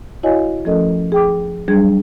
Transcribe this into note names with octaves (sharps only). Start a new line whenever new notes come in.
E4 F#4 C#5 D#5 F5 G#5
F3 A3 C#4 A4 A#4 D#5
G#4 G5 D6
F#3 G3 D4 G#4 G#6